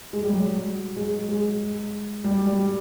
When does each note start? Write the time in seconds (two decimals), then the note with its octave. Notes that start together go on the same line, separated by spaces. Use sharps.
0.13 G#3
0.23 G3
0.33 F#3
0.97 G#3
1.28 G#3
2.24 G3
2.46 G3